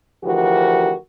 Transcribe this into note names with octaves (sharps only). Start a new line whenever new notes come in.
D2 E3 F3 F#4 G4 A#4